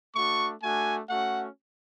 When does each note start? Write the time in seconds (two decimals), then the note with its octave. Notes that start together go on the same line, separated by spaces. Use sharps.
0.16 A3 D4 F#4 C#6
0.63 A3 D4 F#4 G#5
1.10 A3 C#4 F#4 F#5